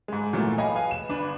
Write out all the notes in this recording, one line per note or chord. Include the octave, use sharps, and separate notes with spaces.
G#2 G#3
A#2 E3 F#3 A3
C#5 D#5 F5 G5 G#5 B5
G#4 B4 F5 G#5
E7
G1 D4 B4